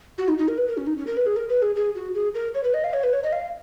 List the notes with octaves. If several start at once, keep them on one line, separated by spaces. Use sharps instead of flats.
F#4
D#4
D#4
A#4
B4
A#4
C#4
D#4
C#4
A#4
B4
G#4
A#4
B4
G#4
G#4
F#4
G#4
A#4
C#5
B4
D#5
F5
C#5
B4
C#5
D#5
F5